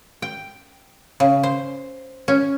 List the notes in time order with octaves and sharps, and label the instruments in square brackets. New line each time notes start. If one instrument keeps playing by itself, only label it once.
[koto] G5
C#3
C5
C#4